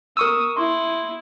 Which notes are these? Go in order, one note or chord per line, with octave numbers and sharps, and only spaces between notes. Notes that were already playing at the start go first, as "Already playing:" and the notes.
A#4 C#6 D#6 E6
E4 C6